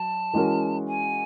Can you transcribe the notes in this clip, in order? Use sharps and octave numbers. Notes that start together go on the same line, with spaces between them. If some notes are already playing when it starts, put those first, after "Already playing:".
Already playing: F#3 A5
E3 G#3 C#4 F#4 A#4
G#5